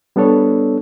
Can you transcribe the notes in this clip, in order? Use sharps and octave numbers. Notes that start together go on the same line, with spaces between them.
G3 B3 D4 A4 C#5